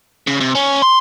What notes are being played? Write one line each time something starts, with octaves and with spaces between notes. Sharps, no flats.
C#3
C3
C#4
C6